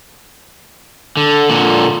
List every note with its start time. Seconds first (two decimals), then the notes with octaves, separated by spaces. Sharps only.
1.17 D3
1.49 A#2 D3